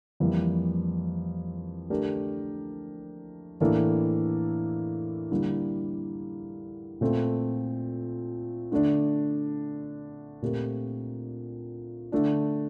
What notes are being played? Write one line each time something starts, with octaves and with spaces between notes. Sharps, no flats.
F2 E3 G3 A#3 E4
D3 A3 D4 G4 A#4
A2 E3 A#3 D4 A4
D3 G3 A#3 E4
A#2 A3 C4 F4 A4
D3 A3 D4
A#2 A3 C4 G4 A#4
D3 A3 D4